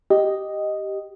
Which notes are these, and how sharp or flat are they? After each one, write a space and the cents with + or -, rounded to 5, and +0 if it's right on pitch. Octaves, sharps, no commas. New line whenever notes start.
G4 -5 D#5 +0